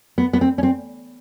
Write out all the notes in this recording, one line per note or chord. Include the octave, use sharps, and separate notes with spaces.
B3
B3
C4
C#4
C4